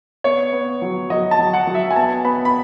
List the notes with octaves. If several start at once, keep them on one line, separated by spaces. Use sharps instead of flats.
B3 C#5
B3
F#3
F#3 D#5
A5
F#3
F#5
F#3
E5
G#5
B3 A5
B3 B5
B5